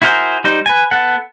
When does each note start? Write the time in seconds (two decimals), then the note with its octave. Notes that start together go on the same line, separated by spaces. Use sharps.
0.02 E4 F#4 G#4 A#4 C5
0.44 G3 D#4 C5
0.66 B4 G#5
0.91 B3 A4 F#5